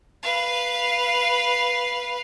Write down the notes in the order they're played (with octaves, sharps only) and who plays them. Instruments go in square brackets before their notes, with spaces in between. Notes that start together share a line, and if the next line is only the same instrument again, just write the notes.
[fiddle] B4 F5